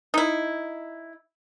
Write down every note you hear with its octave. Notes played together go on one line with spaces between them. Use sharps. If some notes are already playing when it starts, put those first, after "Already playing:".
D#4 E4